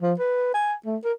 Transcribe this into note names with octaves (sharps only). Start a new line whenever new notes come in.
F3
B4
G#5
A3
A#4